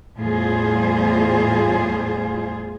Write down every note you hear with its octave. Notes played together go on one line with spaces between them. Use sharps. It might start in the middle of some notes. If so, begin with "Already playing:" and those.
E2 A2 G3 F4 G#4 C5